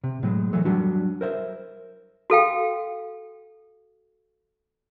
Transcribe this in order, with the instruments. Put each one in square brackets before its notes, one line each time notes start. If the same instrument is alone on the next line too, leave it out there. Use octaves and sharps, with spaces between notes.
[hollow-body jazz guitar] C3
A2 F#3 G#3
E3 F#3 A3
F#3 G3 D4 F#4
A#4 C5 E5
[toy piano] F#4 A4 F5 G5